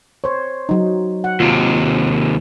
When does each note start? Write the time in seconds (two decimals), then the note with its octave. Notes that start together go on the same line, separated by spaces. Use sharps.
0.24 C5 C#5
0.69 F#3 D#4
1.24 F#5
1.40 D#2 C3 F4